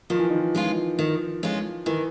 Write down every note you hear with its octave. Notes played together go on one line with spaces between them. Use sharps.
D#3 F3
E3
D#3
E3
G#3 C#4 F4
D#3
G#3 C#4 F4
D#3 E3